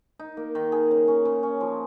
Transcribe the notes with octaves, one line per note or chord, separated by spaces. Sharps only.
D#4
A#3
D#3
G#4
C#3
C#4
C#3
C#4
F3